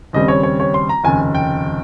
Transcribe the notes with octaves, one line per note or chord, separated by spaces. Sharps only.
D#2 C#3 G3 C4 D#5
C#5
C#5
C#5
C6
A#5
F1 D#2 C#3 G#5
G5